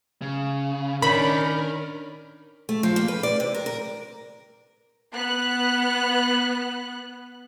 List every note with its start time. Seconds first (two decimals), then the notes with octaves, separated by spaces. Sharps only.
0.22 C#3
1.02 D#3 C#4 D4 A#4 B5
2.69 A3
2.83 F3
2.96 A#3
3.08 B4
3.23 D5
3.40 C3
3.54 A#4
3.66 A#4
5.12 B3 F#6